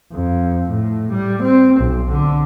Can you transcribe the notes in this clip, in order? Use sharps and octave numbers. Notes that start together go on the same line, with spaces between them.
F2
A2
G3
C4
B1
D3